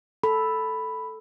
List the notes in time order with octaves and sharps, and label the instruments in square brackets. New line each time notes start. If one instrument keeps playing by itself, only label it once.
[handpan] A4 [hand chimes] B5